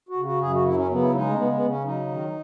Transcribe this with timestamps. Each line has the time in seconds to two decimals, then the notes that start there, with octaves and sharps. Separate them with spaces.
0.09 F#4
0.17 C#3
0.25 F#4
0.41 F#2 G#4
0.53 F#4
0.64 F#3 E4
0.77 C#4
0.89 C#3 B3
1.01 E4
1.13 G#3 D#4
1.29 A3
1.36 C#3 B3
1.52 B3
1.61 C#3
1.69 C#4
1.84 F#3 D#4
2.08 D#3